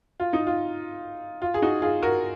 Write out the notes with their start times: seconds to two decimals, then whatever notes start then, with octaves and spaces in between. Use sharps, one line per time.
0.20 F4
0.33 D#4
0.47 F4
1.42 F4
1.54 G#4
1.62 D#4 F#4
1.82 F4 G#4
2.02 F#4 A#4